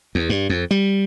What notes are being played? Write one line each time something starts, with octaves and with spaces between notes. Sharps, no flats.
E2
G2
F2
G3